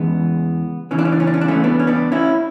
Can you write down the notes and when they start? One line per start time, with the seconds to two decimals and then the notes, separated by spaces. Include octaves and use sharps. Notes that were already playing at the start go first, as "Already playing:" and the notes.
Already playing: E2 C#3 E3 G#3 B3
0.91 E2 C#3 E3 C#4
0.99 D4
1.05 C#4
1.12 D4
1.20 C#4
1.27 D4
1.34 C#4
1.41 D4
1.48 A3 C#4
1.64 B3 D4
1.79 C#4
1.87 B3 D4
2.12 C#4 E4